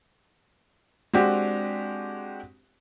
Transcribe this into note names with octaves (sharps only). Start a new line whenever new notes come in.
G#3 C4 D4 F#4 G4